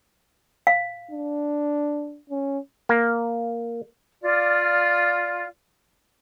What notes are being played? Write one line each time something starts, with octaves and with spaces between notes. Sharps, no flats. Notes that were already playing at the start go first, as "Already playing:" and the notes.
F5
D4
C#4
A#3
F4 D5